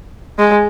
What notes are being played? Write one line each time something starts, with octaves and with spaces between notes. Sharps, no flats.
G#3